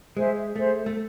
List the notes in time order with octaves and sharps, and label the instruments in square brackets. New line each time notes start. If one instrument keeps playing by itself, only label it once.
[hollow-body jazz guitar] G#3 [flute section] G#4 C5 E5
[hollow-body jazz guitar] A3 [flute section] G#4 C5 E5
[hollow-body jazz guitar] A3